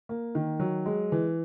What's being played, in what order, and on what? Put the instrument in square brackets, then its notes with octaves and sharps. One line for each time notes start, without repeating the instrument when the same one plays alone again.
[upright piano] A#3
D#3
F#3
G#3
E3